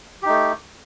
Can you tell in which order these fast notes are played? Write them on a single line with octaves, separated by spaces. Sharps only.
G4 D#4 A3